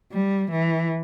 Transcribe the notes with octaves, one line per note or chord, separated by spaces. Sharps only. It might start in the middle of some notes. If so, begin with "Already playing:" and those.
G3
E3